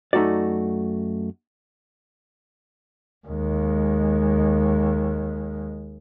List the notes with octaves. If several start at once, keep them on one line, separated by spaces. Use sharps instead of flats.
F#2 A3 D#4 F#4 D5
D#2 G#3